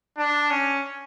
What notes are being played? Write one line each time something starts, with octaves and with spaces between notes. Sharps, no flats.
D4
C#4